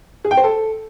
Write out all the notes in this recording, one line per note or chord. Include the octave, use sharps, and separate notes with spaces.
G#4
G5
C5
A4